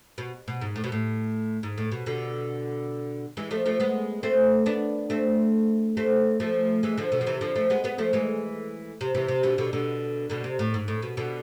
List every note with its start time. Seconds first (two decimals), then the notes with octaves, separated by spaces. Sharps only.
0.18 B2
0.48 B2
0.61 G#2
0.76 A2
0.84 B2
0.92 A2
1.63 G#2
1.78 A2
1.92 B2
2.06 B2 D3
3.37 E3 G#3
3.51 F3 A3
3.66 F3 A3
3.80 G#3 B3
4.23 A3 C4
4.66 B3 D4
5.10 A3 C4
5.97 A3 C4
6.40 F3 A3
6.83 E3 G#3
6.98 D3 F3
7.12 B2 D3
7.21 F3
7.27 C3 E3
7.41 D3 F3
7.56 F3 A3
7.70 G#3 B3
7.84 G#3 B3
7.98 F3 A3
8.13 E3 G#3
9.01 C3
9.15 C3 E3
9.28 C3
9.43 B2 D3
9.58 B2 D3
9.73 B2 D3
10.30 B2 D3
10.44 C3
10.59 A2
10.74 G#2
10.88 A2
11.02 B2
11.17 B2 D3